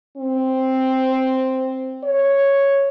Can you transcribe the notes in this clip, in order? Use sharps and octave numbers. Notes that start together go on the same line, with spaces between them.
C4
C#5